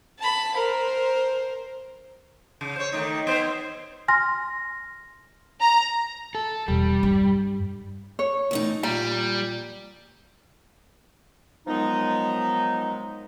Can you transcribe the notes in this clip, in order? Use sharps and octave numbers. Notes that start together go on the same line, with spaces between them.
A5 B5
A#4 C5
C#3
C5 C#5
D#3 A3 D#4
B3 C5
B3
G#5 C6 F6 A#6
A#5
A4
E1 G3
G2
C#5
E2 A2 D#4
A#2 G3 A#5
D#3 F3 F#3 G#3 B3 D#4